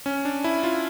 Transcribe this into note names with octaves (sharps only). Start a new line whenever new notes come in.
C#4
D4
E4
F4